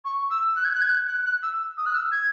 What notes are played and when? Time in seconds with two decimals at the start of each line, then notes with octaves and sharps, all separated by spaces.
0.05 C#6
0.30 E6
0.56 F#6
0.64 G#6
0.73 F#6
0.81 G#6
0.89 F#6
1.08 F#6
1.25 F#6
1.43 E6
1.77 D#6
1.85 F#6
1.94 E6
2.11 G#6